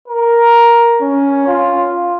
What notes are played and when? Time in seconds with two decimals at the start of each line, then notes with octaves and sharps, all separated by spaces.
0.08 A#4
1.01 C#4
1.47 F4